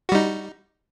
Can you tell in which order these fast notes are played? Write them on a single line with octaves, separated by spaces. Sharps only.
F#4 G3 D#4